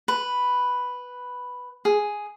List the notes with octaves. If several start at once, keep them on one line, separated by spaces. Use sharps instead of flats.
B4
G#4